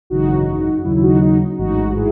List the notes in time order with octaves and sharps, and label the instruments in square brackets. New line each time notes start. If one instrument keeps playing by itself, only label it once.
[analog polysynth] G#1 F#2 C#3 E3 D#4 F#4
D#2 C#3 F#3 E4
E4
D#4 F#4
D#4
A1 G#2 E3 D#4 F#4
E4 G#4